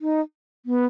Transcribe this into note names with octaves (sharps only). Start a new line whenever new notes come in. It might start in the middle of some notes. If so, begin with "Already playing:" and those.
D#4
B3